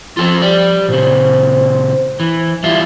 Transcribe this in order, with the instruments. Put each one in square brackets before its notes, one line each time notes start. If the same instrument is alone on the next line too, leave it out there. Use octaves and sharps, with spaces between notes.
[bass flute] F3 [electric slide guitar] F4 A4 C5
[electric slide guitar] G4 D5
[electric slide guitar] A#2 C#3 [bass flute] C5
[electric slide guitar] E3
[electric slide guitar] E3 G3 F4 [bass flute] E5